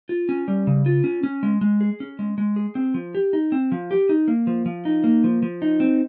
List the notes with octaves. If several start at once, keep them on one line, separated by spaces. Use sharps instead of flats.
F4
C#4
G3
C#3
F4
C#4
C#4
G#3
G#3
G#4
C#4
G#3
G#3
G#4
C4
F3
G4
D#4
C4
F3
G4
D#4
A#3
F3
F3
D#4
A#3
F3
F3
D#4
C4